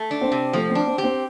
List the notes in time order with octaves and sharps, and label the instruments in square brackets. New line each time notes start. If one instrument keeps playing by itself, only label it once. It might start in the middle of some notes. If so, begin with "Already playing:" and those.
Already playing: [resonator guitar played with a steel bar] A3
D4
[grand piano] C4
[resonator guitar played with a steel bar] C3
[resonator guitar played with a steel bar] F3 [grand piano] A3
[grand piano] C4
[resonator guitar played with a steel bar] D4
[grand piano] C4
[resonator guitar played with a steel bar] G4
[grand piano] C4